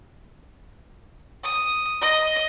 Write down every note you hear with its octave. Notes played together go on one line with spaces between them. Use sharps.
D#6
D#5